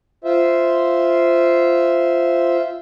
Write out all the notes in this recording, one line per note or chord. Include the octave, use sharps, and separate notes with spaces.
F4 C5 E5